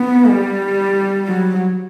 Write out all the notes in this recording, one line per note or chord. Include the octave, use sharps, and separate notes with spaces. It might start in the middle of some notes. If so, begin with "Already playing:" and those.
Already playing: B3
G3
F#3